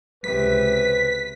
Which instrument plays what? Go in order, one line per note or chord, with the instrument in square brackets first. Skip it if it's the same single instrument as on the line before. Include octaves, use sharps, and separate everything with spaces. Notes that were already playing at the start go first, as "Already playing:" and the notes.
[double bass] C#2 C3 [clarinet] B4 [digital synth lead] B6